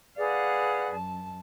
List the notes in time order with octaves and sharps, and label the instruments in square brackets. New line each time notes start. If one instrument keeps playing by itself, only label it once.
[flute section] G#4 B4 D5 [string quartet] F5 F#5
[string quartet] F#2 A5